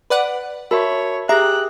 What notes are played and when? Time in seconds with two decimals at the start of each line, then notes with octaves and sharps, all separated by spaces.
0.10 B4 D5 F#5
0.71 F#4 A#4 C#5 E5 A5 B5
1.29 G4 G#4 E5 G5 A#5 F#6